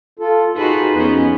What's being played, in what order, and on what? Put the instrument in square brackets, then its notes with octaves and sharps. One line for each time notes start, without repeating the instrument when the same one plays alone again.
[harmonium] F4 A4
[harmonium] D#4 G#4 [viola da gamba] F4 F#4 B4
[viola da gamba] F2 B3 C#4